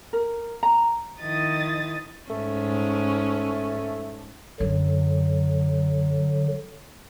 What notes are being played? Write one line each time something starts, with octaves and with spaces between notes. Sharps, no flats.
A#4
A#5
D#3 F3 E4 D#5 D#6 A6
G#2 A3 C#4
F#2 D3 F#3